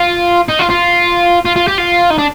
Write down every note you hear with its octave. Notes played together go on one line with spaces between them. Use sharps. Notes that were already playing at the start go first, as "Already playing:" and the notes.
Already playing: F4
D#4
F4
F4
F4
F4
G4
F4
D#4
D4